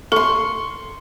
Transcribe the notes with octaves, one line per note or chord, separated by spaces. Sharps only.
A4 C6 C#6